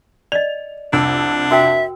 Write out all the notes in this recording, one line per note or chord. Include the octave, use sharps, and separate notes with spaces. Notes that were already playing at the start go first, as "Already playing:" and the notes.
D5 D#5 F7
C2 F2 D4 E6
F#4 A#4 E5 G5